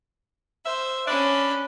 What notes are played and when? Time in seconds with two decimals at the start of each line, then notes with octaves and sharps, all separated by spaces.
0.65 C5 E5
1.07 C#4 D4 B5